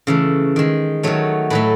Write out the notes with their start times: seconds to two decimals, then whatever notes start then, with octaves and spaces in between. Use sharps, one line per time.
0.07 C#3 E3 A3
0.56 D#3 G#3
1.03 D#3 F#3 A3 C#5
1.50 A2 F#3 A3 B4